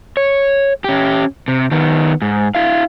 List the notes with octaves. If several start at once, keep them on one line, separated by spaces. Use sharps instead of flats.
C#5
C#4 G4
C3
D#3 B3
G#2
E4 F5